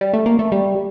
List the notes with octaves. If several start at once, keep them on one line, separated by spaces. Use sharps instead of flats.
G3
A3
A#3
A3
G3